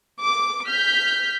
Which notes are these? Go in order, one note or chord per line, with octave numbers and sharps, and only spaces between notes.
D6
F6 G6 B6